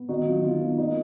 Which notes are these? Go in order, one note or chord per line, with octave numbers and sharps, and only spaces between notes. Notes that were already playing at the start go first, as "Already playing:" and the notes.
Already playing: B3
D#3 D#4 F#4
F#3 F4
D#3 F4
A#3 F4
A#3 D#4